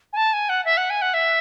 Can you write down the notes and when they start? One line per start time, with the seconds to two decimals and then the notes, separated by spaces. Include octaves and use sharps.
0.13 G#5
0.17 A5
0.33 G#5
0.49 F#5
0.65 E5
0.77 F#5
0.90 G#5
1.02 F#5
1.14 E5